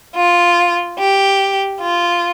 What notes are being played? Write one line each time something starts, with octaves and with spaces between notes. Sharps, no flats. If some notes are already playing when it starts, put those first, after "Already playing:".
F4
G4
F4